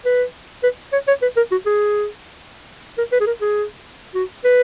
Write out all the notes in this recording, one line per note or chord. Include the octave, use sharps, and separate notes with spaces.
B4
B4
C#5
C#5
B4
A#4
F#4
G#4
A#4
B4
G#4
A#4
G#4
F#4
B4